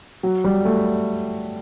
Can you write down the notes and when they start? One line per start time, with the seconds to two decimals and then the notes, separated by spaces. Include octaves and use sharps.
0.23 F#3
0.44 G3
0.65 A3